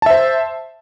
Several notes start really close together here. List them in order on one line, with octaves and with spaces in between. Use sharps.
A5 E5 C5